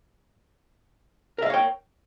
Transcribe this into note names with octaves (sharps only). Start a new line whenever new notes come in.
A#4 C#5 E5 F5 G5